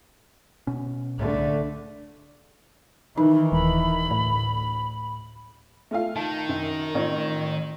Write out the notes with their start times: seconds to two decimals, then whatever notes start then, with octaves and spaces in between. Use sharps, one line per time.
0.67 B2 C#4
1.18 C2 D3 A3
3.18 D#3 E3 D#4
3.52 D#1 B5
4.11 D2 A2
5.91 A3 F4 F5
6.16 D#3 A5
6.49 F#2
6.94 A1 F4 C#5